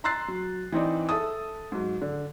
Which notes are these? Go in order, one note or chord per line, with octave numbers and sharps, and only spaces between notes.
A#5 C6 E6 F#6 A6 C7
F#3
E3 C4 D#4 D5
A4 E5 A5 D#6
G#2 F#3
D3